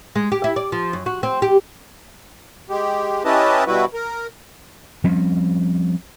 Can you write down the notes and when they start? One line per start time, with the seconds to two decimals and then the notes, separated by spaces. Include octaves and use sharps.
0.16 G#3
0.32 G4
0.44 E4
0.56 D5
0.72 F3
0.93 F#2
1.06 F#4
1.23 C4
1.42 G4
2.70 G#3 G4
3.25 C#4 E4 G4 B4 D#5 A5
3.67 B2 G3 E4 F#4 B4
3.94 A#4
5.04 F3 G3 C4 C#4